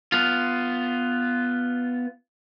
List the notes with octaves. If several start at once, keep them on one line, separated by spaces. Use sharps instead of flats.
B3 F4